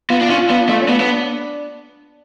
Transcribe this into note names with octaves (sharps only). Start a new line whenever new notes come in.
B3 F4
D4
C#4 F4
B3 D4
A3 F4
C#4
B3 D4
B3